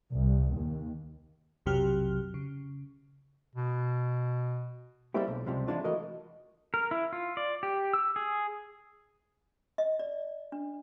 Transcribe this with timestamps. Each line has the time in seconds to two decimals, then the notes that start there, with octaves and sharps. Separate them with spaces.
0.12 C2
0.55 D#2
1.66 B1 F2 C3 F#3 G4 F6
2.34 C#3
3.55 B2
5.14 G3 G#3 A#3 C4 E4 G4
5.28 B1
5.46 C#2 C3 F3 G3 G#3
5.67 E3 G#3 D4 F4
5.84 E3 A3 F#4 A#4 D#5
6.74 A#4
6.91 E4
7.13 F4
7.37 D5
7.63 G4
7.93 E6
8.16 G#4
9.78 D#5
9.99 D5
10.52 D4